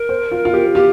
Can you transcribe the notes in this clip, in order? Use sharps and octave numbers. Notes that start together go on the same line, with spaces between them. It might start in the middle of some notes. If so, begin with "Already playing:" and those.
Already playing: A#4
C5
F4
F4
G4
F4 G4